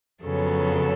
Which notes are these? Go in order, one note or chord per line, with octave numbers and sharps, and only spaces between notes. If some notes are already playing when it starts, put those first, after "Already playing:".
F2 C#3 F#3 B3 A4